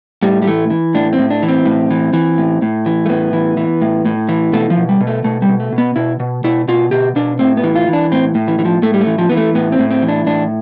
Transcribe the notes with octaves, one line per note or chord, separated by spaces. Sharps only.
A2 G3
G3
E3 A3
E3
A2 D4
C4
A2
D4
E3
C4
A2
E3
E3
A2
A2
E3
A3
A2 B3
E3
E3
A2
A2
E3
B2 A3
F3
B2
G3
B2
A3
B2 A3
G3
B2
A3
B2
B3
B2 E4
B2
B2 E4
B2 F4
B2 G4
B2 D4
A2 C4
B3
E3
F4
E3
D4
A2 C4
A2
E3
E3
F3
A2 A3
G3
A3
E3
F3
E3 B3
A3
A2 B3
C4
A2
C4
E3
D4
A2 D4